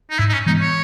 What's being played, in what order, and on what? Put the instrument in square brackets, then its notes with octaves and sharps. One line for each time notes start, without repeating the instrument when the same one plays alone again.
[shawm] D#4
[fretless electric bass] G#2 [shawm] E4
[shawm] D#4
C#4
[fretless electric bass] E3 G#3 B3 [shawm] D#4
[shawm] C#5